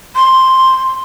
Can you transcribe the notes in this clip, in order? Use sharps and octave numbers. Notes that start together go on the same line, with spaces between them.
C6